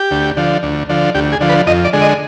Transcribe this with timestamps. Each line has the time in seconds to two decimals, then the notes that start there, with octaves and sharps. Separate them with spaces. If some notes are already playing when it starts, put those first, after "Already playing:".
Already playing: G4
0.11 D2
0.37 D3 F3
0.63 D2
0.89 D3 F3
1.14 D2 G4
1.32 G#4
1.41 D3 F3
1.49 B4
1.67 F2 D#5
1.84 D5
1.93 D3 G#3
2.02 D#5